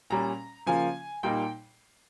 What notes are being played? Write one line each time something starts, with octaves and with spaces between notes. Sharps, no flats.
A#2 G3 C#4 A#5
C#3 F3 A#3 F4 G#5
A#2 G3 A#3 D#4 G5